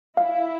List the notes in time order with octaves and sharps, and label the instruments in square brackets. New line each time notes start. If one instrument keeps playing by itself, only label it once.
[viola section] E4 [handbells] F5